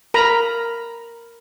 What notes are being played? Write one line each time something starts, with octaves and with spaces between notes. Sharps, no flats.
A#4 A#5 B5